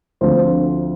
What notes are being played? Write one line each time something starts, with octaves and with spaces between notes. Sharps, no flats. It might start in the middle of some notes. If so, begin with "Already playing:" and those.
D2 D3 F3 C4 C5